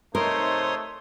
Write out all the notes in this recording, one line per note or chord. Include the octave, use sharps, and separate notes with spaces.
C3 A3 D#4 A#4 C5 C#5 C6 D#6